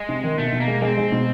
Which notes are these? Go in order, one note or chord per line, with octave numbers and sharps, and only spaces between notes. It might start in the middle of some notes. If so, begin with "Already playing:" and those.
Already playing: G#3
C3
D#3
B2 A3
B2
A#3
G#3
G#3 C4
G#3
B2